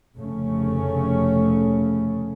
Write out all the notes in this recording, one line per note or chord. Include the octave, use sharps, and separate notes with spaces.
F1 C#3 A3 C#4